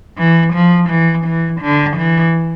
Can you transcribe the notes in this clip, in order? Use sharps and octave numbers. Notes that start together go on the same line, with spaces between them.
E3
F3
E3
E3
D3
E3